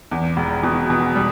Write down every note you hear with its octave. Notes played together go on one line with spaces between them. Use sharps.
E2
E1
B2
B2
G3